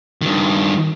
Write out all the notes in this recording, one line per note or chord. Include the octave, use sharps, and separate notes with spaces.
G2 D#3